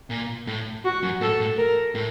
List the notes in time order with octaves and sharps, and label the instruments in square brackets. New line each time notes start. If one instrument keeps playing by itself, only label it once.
[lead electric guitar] A#2
A2
[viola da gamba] F#4
[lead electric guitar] F#2
[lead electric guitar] A2 [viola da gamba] A4
[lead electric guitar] A2
[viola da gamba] A#4
[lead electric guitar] A2